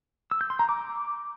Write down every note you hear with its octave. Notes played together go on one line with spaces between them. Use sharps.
E6
G6
C6
A#5
D6